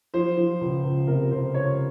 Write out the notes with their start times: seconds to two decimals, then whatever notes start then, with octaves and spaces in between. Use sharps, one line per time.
0.14 F3 C5
0.37 F3
0.61 C#2
0.84 C#2
1.07 C3 A#4
1.31 C#2 C5
1.54 C#2 C#5